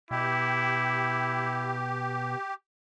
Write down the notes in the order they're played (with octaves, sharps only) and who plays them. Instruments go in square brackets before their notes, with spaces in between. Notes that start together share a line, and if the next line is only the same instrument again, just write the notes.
[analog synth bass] B2 [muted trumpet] E4 [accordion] G4